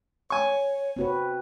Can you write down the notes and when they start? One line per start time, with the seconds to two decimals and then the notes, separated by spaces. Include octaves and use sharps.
0.30 C#5 G#5 C#6
0.96 C4 F#4 B4